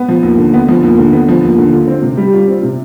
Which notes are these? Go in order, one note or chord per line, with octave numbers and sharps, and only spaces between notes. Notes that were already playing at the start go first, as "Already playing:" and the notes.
Already playing: B3
F3
D#2
D3
B3
F3
D#2
D3
B3
F3
D#2
D3
F4
C4
C3
G3
F4
C4
C3